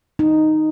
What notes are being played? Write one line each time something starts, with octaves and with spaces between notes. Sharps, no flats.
D#4